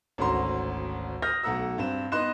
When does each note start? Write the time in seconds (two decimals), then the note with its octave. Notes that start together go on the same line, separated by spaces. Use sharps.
0.18 G#1 D2 C#4 F#4 A#5 C6
1.22 D#6 F6 G6 A#6
1.43 B1 A3 F#5 A#5 E6
1.78 G2 C4 E7
2.12 B3 D#4 D#5 C6 F#6 E7